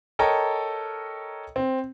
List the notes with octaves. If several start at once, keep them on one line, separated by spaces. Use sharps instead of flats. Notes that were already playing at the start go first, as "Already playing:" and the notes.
A4 A#4 C#5 D#5 G5 A#5
C4